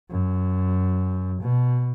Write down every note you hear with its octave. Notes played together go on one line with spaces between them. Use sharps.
F#2
B2